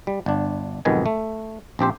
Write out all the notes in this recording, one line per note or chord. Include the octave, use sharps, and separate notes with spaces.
G3
G1 D4
B1 F2 G#2 D#3 B3 G#5
A3
A#1 C4 G4 C5